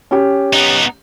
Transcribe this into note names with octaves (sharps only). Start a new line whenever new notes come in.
C#4 G4
B3 D#4